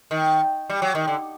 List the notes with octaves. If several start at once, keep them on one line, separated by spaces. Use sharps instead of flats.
D#3
G3
F#3
D#3
D3